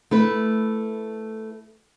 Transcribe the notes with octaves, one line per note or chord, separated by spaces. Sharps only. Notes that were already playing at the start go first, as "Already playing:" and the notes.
A3 E4 B4